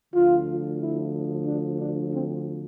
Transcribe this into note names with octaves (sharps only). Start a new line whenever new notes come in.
D2 D3 F3 F4
E4
D4
D4
C4